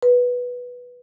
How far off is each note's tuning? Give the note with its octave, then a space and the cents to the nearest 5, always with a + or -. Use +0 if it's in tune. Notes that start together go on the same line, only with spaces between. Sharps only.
B4 -5